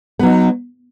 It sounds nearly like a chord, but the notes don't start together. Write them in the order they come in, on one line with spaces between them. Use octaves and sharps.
B3 F#3 D#4